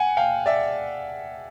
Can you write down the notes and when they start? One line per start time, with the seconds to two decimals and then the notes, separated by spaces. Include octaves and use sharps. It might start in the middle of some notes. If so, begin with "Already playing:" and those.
Already playing: F#5 G#5
0.17 F5 G5
0.46 D5 E5